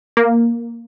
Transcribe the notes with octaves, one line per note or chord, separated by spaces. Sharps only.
A#3